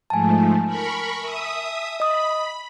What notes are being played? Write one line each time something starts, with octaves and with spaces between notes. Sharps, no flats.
G#2 F3 A3 G#5 A5
A#4 B5 C#6
E5 D#6
D#5 B5 D#6